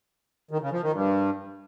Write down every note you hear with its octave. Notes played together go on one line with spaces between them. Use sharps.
D#3
C#3
F3
D#3
G2